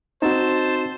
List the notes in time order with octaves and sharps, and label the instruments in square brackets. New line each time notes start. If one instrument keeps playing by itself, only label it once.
[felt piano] C4 [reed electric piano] D#4 F#4 [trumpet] C5 [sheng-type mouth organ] A5